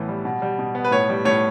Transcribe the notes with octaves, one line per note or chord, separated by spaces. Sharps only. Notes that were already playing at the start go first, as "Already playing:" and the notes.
Already playing: A2 E3 B3
G3
B2
G3
B2
B3
B4
A2 C#5
G3
A2 C#5